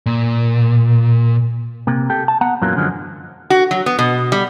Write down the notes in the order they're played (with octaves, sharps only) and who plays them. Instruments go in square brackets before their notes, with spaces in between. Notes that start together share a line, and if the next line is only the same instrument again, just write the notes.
[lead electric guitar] A#2
[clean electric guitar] C3 A#3
G4 A4 G5
A5
B3 F#5 A#5
F#2 A#2 E3 F#3 A#3
F#2 D3 F3 F#3 G#3
[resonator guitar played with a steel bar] F#4
F#3
B3
B2
G3